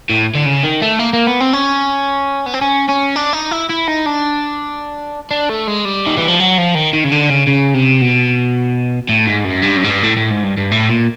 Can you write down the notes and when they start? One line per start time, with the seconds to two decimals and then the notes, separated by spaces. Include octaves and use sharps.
0.10 A2
0.35 D3
0.46 C#3
0.64 D#3
0.82 A3
0.99 A#3
1.13 A#3
1.27 B3
1.40 C4
1.53 C#4
2.46 B3
2.54 C4
2.61 C#4
2.89 C#4
3.16 D4
3.33 D#4
3.51 E4
3.69 E4
3.87 D#4
4.06 D4
5.31 D4
5.49 A3
5.68 G#3
5.85 G3
6.06 D#3
6.17 E3
6.28 F3
6.40 F#3
6.58 F3
6.75 D#3
6.93 D#3
7.04 C#3
7.12 D3
7.30 C#3
7.47 C#3
7.74 C3
8.02 B2
9.09 A2
9.27 G#2
9.45 F#2
9.63 G2
9.77 F#2
9.84 G#2
9.91 G2
10.04 A2
10.17 A2
10.31 G#2
10.44 G2
10.58 G2
10.71 A2
10.89 A#2